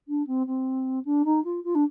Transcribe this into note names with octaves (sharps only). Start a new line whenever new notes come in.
D4
C4
C4
D4
D#4
F4
F4
D4